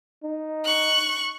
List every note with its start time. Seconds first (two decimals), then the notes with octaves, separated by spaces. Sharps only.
0.23 D#4
0.64 C#6 F#6